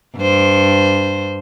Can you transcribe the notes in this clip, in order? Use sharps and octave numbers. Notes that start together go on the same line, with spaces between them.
G2 C5